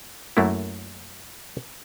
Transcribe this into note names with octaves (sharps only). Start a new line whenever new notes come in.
F#2 F#3 A3 A#3 E4